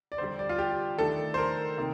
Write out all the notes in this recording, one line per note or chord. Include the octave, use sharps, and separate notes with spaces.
D5
F2 D3 G3 C5
D5
F4
G4
D#3 A3 D4 A4
C5
A#4
C3 D#3 A#3 D#4